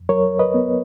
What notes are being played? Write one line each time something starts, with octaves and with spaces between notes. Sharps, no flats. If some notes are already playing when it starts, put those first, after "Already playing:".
Already playing: F2
F#3 A#4 C#5
B4 D#5
B3